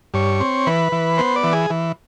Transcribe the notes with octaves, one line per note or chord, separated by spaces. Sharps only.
G2 C#5
C4
E3 B4
E3
B3 C5
D5
E3
G#4
E3